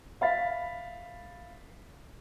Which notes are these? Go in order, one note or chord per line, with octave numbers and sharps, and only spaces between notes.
E5 F5 B5 A6 B6